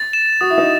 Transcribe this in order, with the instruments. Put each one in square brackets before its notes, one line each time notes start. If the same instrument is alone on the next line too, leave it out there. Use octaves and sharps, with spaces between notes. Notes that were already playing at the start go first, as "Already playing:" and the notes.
Already playing: [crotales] A6
E7
[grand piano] F#4 [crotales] D#6
[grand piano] E4
D#4